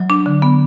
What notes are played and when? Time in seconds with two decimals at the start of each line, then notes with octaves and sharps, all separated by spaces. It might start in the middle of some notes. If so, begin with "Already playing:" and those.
Already playing: F#3
0.10 D4
0.26 D3
0.42 B3